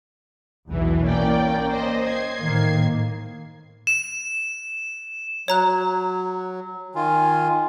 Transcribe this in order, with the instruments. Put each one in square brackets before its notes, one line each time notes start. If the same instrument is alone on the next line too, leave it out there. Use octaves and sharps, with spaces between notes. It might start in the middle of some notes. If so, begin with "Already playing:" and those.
[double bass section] B1 E2 B2 [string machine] E3
[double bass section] A#3 C#4 [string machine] D5 G5
[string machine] C5 D#5
G#6 C7
[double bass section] A2 D#3 A#3
[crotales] E7
[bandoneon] F#3 [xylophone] C#5 A#5 F#6
[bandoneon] D#3 F4 [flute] G#5